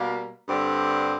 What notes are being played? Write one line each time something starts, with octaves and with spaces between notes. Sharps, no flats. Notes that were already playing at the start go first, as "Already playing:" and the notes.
Already playing: B2 G3 A#3
G2 D3 G3 C4